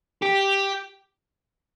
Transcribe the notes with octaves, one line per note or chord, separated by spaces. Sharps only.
G4